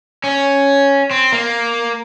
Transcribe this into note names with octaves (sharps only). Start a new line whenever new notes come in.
C#4
C4
A#3